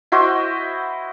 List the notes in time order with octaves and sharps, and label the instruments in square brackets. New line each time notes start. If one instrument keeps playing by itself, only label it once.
[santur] E4 F#4 C5 D#5